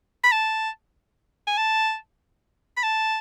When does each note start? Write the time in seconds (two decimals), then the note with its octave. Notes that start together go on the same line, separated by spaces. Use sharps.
0.24 B5
0.32 A5
1.47 G#5
1.57 A5
2.77 B5
2.83 A5